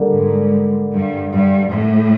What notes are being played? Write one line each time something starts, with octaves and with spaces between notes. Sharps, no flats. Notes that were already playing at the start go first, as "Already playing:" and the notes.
Already playing: D3 G3 A#3
G#2
G2
G2
A2